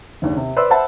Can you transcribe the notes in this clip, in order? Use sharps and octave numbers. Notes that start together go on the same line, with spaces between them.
F#1 D#2 D4
C3
B4 C5 D5 C6 E6
C5 E5 F#5 A5 B5